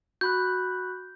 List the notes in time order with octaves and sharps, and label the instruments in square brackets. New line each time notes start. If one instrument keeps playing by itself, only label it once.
[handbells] F#4 B5 F#6 [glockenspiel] G6